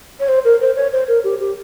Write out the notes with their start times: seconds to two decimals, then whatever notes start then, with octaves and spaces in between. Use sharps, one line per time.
0.20 C#5
0.28 C5
0.45 A#4
0.61 C5
0.76 C#5
0.92 C5
1.08 A#4
1.24 G4
1.40 G4